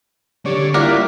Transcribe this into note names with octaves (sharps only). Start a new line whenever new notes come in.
D3 D4 G4 C#5 D5
G3 A#3 E4 F4 A#4 D5 E5 F#5